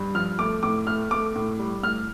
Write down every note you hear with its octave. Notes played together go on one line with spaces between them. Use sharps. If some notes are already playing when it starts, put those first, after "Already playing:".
Already playing: G2
F3 F6
A3 D6
A2 D6
A3 F6
A3 D6
A2
G3
A2 F6